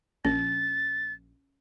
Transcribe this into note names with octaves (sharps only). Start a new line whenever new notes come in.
A#1 C#4 A6